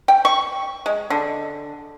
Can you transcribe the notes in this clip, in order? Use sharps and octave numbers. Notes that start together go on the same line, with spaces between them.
G5
C#6
G#3
D3